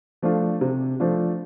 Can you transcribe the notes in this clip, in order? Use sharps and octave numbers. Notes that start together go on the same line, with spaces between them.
F3 A3 D4 F4
C3
F3 A3 D4 F4